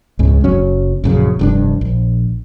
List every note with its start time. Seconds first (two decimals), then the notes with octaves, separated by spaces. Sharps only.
0.19 C#2 G#2 C#3
0.44 F#1 F#3 C#4
1.04 A#1 F#2 C#3
1.39 F1 G2 D4
1.81 A#1